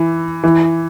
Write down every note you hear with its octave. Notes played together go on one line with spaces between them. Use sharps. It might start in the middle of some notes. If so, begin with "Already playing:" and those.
Already playing: E3
E3